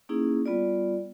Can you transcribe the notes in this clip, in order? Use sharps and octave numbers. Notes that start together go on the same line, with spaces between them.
A#3 C#4 D#4 E4 G#4
G3 B3 F4 D5